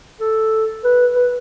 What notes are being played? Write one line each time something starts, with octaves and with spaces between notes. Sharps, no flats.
A4
B4
B4